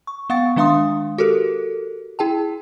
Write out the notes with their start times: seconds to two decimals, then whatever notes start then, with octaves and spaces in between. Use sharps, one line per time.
0.07 C#6
0.30 B3 F5 F#5 C#6 A6
0.56 D#3 G#3 D4 F5 C6 D#6
1.18 F#4 G4 A4 A#4
2.19 E4 G#4 G5 A5